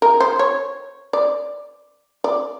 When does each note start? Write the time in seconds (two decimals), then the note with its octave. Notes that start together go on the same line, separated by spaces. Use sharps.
0.02 A#4
0.20 C5
0.39 C#5
1.13 D5
2.24 D5